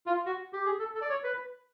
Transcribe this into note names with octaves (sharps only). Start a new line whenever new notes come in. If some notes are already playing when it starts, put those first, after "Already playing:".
F4
F#4
G4
G#4
A4
A4
D5
C#5
B4